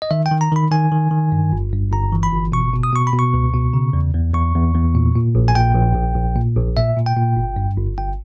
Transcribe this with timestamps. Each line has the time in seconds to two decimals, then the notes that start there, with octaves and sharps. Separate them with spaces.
0.02 D#5
0.11 D#3 E5
0.26 G5
0.31 D#3
0.41 A#5
0.52 D#3 B5
0.71 D#3 G#5
0.92 D#3
1.11 D#3
1.32 G2
1.53 G1
1.73 G2
1.92 G1 A#5
2.12 E3
2.23 B5
2.32 G1
2.52 B2 C#6
2.73 B2
2.83 D#6
2.93 B2 C#6
3.07 B5
3.13 B2
3.19 C#6
3.34 C#2
3.54 B2
3.74 C#3
3.93 E2
4.14 E2
4.34 E2 C#6
4.55 E2
4.74 E2
4.95 A#2
5.15 A#2
5.35 A#1
5.48 G#5
5.55 A#2 G5
5.75 A#1
5.96 A#1
6.15 A#1
6.36 A#2
6.56 A#1
6.77 A#2 E5
6.97 A#2
7.06 G5
7.16 A#2
7.36 G1
7.56 G2
7.77 G1
7.97 G1 G5